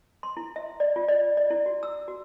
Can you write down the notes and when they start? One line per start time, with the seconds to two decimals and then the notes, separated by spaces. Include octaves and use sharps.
0.23 C6
0.37 E4
0.56 E5
0.80 D5
0.96 F4
1.08 D5
1.37 D5
1.50 E4
1.66 F#4
1.83 E6
2.08 F#4